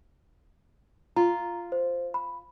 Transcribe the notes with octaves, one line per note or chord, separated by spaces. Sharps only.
F4 A#5
C5
B5